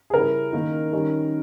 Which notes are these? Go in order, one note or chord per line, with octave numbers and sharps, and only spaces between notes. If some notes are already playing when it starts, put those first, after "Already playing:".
G#4
C#3 G3 C#4 E4 A#4
D#3 A#3 D#4
D#3 G3 C#4